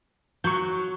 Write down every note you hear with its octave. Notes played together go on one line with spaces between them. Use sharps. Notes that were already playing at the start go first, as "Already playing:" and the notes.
F#3 C#6 F#6 G6